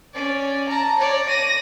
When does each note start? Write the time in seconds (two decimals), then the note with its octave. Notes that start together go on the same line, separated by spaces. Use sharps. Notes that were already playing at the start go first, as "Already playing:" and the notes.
0.14 C#4 D5
0.69 A5 A#5
0.99 C#5 D5
1.28 A#6 D#7